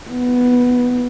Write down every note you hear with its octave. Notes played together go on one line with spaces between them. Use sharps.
B3